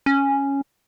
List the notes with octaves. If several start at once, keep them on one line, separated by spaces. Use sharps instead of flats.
C#4